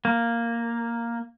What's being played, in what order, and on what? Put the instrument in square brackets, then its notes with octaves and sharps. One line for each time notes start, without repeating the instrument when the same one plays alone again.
[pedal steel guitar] A#3